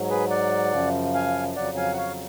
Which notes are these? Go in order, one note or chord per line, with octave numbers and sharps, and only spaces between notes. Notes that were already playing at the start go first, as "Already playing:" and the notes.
Already playing: G#2 F#3
G#4 B4
D5 F#5
F#2 C#3 F3
F5 G#5
F2 C#3 F#3 D5 F#5
F5 G#5
F#5
C#5 F5